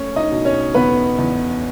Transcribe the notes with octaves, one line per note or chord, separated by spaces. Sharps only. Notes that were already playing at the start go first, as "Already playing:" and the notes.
Already playing: A3 C#4 C#5
D#4 D#5
B2
C#4 C#5
E2 B3 B4
E2